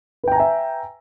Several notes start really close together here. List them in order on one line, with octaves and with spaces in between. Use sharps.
B4 G5 A#5 G#5 E5